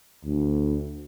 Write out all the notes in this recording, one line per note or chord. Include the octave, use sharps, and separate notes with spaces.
D2